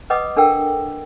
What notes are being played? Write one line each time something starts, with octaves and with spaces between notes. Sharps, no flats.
B4 D#5 F#5 D6 D#6
D4 A4 A#4 F#5 G5 E6